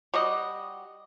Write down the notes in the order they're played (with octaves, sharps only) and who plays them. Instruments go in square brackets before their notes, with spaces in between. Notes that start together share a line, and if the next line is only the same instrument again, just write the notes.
[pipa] G3 F#4 D#5